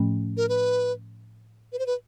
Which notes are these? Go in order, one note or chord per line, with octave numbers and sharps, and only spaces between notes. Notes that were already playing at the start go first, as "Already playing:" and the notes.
Already playing: A2 F3 A3 C#4
A#4
B4
B4
C5
B4